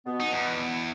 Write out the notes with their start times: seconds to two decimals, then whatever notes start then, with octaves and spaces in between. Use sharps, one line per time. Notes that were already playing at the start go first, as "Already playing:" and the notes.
0.06 B2 B3
0.20 D#4
0.32 E2